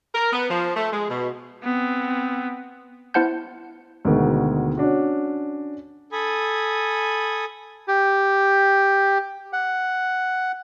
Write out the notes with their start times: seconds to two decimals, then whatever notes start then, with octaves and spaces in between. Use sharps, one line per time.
0.15 A#4
0.33 B3
0.50 F3
0.76 A3
0.93 G#3
1.10 B2
1.64 B3 C4
3.14 B3 E4 C5 F#5 A5 G6
4.05 D2 B2 D#3 G#3
4.77 C#4 D4 F#4
6.12 A4 G#5 B5 D#6
7.88 G4
9.53 F#5